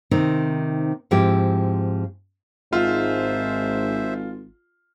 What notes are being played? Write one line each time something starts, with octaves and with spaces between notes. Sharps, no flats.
C3 D#3 C4 D#4
G#2 F3 C4 E4 G4
G#1 G#2 F4 C5 E5